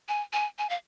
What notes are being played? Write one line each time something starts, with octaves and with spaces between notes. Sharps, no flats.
G#5
G#5
G#5
F5